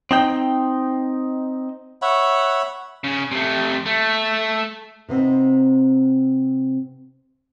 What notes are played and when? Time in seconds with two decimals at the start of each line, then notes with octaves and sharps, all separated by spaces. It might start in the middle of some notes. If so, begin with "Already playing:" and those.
0.11 C4 D#4 G5
2.02 C#5 E5 F#5 B5
3.04 C#3
3.31 C3 A3
3.86 A3
5.08 C3 B3 C4 D#4